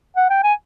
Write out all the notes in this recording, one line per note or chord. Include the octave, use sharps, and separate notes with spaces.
F#5
G5
G#5